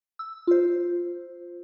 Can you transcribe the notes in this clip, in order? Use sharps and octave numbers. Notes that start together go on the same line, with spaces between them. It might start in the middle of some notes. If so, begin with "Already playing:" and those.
E6
F4 C5